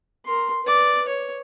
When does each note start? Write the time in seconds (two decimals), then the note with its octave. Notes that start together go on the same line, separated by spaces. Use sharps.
0.25 A#4 C6
0.63 B4 D5
1.08 C#5